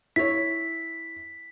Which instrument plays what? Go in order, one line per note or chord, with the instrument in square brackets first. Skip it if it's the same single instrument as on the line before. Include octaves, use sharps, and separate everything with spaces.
[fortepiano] E4 C#5 [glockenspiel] B6